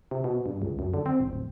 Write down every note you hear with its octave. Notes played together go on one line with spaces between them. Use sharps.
C3
B2
G2
C#2
F#2
D3
C4
E1
D1